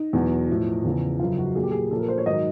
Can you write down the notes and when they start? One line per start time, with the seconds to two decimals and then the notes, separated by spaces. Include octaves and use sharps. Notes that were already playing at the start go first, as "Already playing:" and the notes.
Already playing: D#4
0.13 E2 B2 F#3
0.48 A2 F3
0.84 E2 C#3 F3
1.20 F#2 C#3 F3 F4
1.38 F#4
1.55 A#2 F#3 G#4
1.63 G4
1.71 G#4
1.91 A#2 F3 A4
1.99 A#4
2.09 C5
2.18 C#5
2.26 G#2 D#3 F#3 D#5